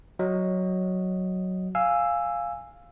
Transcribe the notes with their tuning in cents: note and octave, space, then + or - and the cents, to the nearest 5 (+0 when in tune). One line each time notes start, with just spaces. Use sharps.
F#3 +0 D#5 +0
F5 +0 G#5 -10 E6 +5